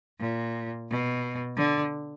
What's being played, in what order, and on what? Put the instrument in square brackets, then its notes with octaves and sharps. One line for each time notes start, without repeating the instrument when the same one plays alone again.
[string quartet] A#2
B2
D3